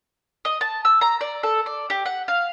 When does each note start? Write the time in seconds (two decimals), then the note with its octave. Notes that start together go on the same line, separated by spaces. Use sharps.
0.45 D#5
0.61 A5
0.85 E6
1.01 A#5
1.21 D5
1.43 A4
1.66 D5
1.90 G4
2.06 F#5
2.28 F5